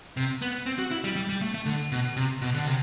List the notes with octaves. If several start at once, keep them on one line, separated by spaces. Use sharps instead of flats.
C3
B3
C4
F#4
E4
G3
G3
G3
A3
A3
D3
B2
C3
B2
D3
C3